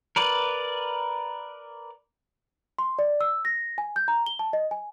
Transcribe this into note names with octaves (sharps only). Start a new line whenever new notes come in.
A#4 B4 D5
C6
D5
E6
A#6
G#5
G6
A#5
G7
A5
D#5
G#5